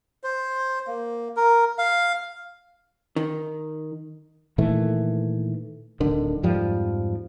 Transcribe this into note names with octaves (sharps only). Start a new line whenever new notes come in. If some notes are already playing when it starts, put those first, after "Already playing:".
C5
A#3
A#4
F5
D#3
A#2 D#3 E3 A3
D1 D3 D#3
F2 G#2 F3 G3